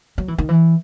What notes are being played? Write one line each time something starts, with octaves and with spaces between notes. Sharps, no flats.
F#3
E3
D#3
E3